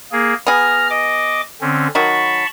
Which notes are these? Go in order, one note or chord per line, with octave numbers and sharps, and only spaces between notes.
A#3 G#4
B3 G#4 A#5 F6
D#5 D6
D3 C4 C#4
D#3 F#3 F#4 A5 B5 C#6